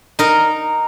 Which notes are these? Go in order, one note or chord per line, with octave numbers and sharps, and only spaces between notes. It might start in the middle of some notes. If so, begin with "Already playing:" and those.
D#4 A#4